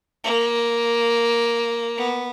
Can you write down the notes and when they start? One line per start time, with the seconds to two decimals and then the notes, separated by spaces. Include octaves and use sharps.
0.24 A#3
1.98 B3